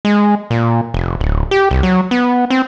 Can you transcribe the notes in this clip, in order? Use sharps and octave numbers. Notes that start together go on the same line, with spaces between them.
G#3
A#2
F1
D1
G4
C2
F#3
B3
C4